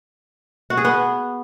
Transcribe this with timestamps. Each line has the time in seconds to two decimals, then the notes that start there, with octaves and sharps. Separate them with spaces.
0.70 F#4
0.77 G#4
0.85 B3